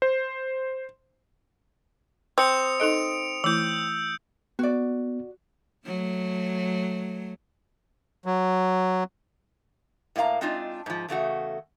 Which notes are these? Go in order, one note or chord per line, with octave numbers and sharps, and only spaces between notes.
C5
C4 D#6 C#7 F7
D#4 A4 D#5 D7 F7
E3 A3 E4 E6 G6
B3 F#4 D5
F#3 A3
F#3
A2 A#3 C4 F5 A#5
G#3 C4 D4 D#4 F4
G#2 F3
E2 C#3 A3 F#4